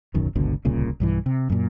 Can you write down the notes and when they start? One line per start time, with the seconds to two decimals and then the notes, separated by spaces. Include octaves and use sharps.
0.14 D1 B1 F#2 D#3
0.35 G1 C#2 B2 D3
0.65 D1 C2 A#2 C#3
1.00 B1 G2 E3
1.26 C3
1.50 F#2 A#2